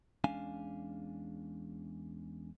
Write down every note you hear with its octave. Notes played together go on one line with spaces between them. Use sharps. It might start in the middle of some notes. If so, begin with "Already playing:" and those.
E2 G#3 C#4 D4 F5 G#5